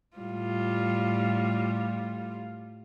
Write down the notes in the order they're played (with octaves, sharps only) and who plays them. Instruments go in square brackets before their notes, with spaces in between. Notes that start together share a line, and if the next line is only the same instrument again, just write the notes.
[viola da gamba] A2 G3 F4